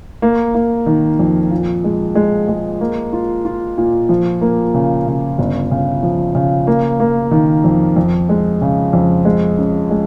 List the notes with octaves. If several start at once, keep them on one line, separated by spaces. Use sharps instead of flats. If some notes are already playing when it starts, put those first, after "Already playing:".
A#3
A#3
D#3
F2
A#2
G#3
G#3
G#3
A#3
F4
F4
A#2
F3
A#3
C#3
C#3
G1
C#3
F3
C#3
A#3
A#3
D#3
F2
F2
G#3
C#3
F2
G#3
C#4
G#3